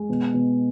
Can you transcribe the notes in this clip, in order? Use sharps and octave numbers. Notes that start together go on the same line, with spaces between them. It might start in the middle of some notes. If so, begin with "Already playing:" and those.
Already playing: G#3
B2
B2